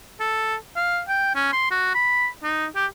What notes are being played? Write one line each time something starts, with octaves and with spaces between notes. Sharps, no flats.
A4
F5
G5
C#4
C6
F#4
B5
D#4
G4